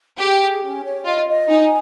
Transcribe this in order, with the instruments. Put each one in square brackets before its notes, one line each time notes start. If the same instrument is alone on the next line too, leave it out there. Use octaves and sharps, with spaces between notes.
[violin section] G4 [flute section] G#4
[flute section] G#4
C#4
C#5
[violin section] F4 [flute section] D#5
[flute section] D#5
[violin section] D#4 [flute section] G#5